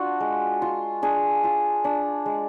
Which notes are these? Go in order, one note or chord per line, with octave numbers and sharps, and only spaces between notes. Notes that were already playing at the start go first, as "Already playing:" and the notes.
Already playing: D4 F4 F#4
G#3
F4
D4 G#4
F4
D4
G#3